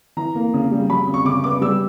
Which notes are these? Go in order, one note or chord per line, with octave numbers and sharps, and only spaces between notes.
E3 A#5
A#3
C#3
G3
F#3 B5
C#3
C#6
C#3 D6
B3 D6
G3 E6